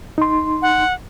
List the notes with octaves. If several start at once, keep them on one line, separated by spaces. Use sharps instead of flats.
D#4 C6
F#5